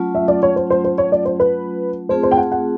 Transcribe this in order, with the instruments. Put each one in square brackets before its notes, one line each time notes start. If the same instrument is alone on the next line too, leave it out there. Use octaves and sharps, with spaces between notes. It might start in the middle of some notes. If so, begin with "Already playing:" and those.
Already playing: [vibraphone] F#3 A3 C#4 F4
[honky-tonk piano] E5
D5
C#5
C5
C5
C5
C#5
D5
C5
B4
[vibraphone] A3 C4 F4 G#4 [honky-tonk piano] C5
[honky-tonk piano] C5
G5
F#5
F#5